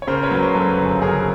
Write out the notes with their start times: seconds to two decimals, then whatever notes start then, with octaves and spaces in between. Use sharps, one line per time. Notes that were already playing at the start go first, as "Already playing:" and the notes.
0.02 C#5
0.07 C#3 A#4 C5
0.23 B4 C#5
0.31 F#3
0.43 C5
0.54 F#2 A4 B4
0.78 G1
1.02 C#3 G#4 A#4